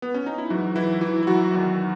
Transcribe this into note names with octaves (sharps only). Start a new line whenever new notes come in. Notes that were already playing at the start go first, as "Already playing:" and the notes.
B3
C#4
D#4
E4
G#2 E3 F#3 F#4
E3 E4
E3 E4
E4
F#3 F#4
E2 D#3